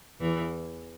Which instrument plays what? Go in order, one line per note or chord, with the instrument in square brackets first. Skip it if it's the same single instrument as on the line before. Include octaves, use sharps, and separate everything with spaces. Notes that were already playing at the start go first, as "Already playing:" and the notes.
[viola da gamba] E2 E3